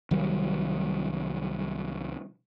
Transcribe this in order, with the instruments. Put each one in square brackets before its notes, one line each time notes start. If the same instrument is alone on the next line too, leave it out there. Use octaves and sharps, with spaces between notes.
[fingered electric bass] C2 D#3 F#3 G3